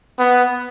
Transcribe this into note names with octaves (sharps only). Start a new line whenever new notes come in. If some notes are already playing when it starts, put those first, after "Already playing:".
B3